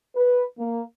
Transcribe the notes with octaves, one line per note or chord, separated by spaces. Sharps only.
B4
A#3